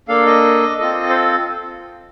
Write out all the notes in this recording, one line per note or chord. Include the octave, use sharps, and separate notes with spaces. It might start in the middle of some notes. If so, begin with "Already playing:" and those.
A#3 D4 A4 F5
D#5
C4 F4 A4 D#5
C5